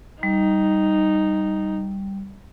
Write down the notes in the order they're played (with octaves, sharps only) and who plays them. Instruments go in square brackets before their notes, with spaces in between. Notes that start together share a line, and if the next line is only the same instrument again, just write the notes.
[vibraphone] G3 [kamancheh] D#4